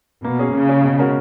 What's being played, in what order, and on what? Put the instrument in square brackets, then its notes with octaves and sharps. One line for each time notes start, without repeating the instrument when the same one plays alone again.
[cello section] B2 [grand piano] A#3
[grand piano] C#4 G#4
[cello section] C#3 [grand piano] A#3
[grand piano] C#4 G#4
B2
G#3 C#4 F#4 A#4